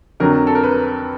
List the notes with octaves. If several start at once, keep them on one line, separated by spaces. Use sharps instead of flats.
F2 D3 F#3 A#4
A4
A#4
B4